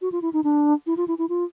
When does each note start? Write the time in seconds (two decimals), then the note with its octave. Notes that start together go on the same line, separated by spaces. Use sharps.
0.01 F#4
0.12 F4
0.22 E4
0.33 D#4
0.44 D4
0.87 E4
0.97 F4
1.08 E4
1.18 E4
1.29 F4